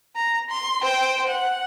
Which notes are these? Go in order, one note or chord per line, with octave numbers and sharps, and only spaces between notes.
A#5
C6
C5 G5
F#5